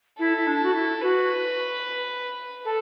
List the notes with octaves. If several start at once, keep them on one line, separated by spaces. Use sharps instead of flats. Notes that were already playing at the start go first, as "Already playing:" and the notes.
E4 A4
E4
D4
F#4
E4
F#4 B4
A4